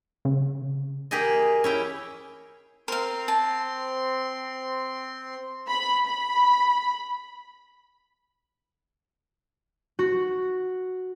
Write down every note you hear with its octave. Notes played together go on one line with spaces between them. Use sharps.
C#3
A#3 G4 G#4 D#5
C#4 E4 G5
C4 A#4 F5 C6
A5
B5
B5
F#4